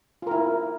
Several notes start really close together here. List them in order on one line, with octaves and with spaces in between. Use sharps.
F4 A#4 E4